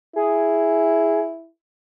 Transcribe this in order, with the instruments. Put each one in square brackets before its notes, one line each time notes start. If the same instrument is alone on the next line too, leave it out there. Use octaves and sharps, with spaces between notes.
[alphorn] E4 [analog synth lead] G#4